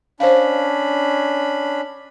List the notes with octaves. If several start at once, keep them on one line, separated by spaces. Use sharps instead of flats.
C#4 D4 C5 F5 B5